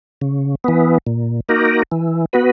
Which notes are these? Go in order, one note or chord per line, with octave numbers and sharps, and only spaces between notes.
C#3
E3 B3
A#2
A#3 D#4 F#4 A#4
E3
B3 F#4 B4